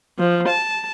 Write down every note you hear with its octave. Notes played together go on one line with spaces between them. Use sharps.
F3
A5